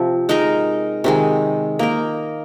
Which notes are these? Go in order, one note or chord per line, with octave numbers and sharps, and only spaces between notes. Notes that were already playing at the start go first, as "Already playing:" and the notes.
Already playing: C3 F3 C4
G#3 D#4 A#4
C3 D#3 G#3
A#3 D#4 A#4